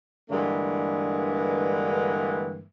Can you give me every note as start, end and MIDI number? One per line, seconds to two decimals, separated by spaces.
0.30 2.63 43
0.30 2.63 50
0.30 2.63 52
0.30 2.63 56
0.30 2.63 58